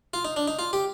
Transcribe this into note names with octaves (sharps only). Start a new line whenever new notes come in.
F4
D#4
D4
D#4
F4
G4